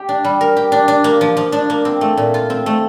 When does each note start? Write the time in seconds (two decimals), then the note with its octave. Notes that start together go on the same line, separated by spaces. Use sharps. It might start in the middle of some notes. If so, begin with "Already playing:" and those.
Already playing: G4
0.09 D4
0.24 G3
0.41 A#4
0.57 G4
0.72 D4
0.88 D4
1.04 A#3
1.21 F3
1.37 F3
1.52 D4
1.70 A#3
1.85 C4
2.01 A3
2.17 A#2
2.34 F4
2.50 C4
2.66 A3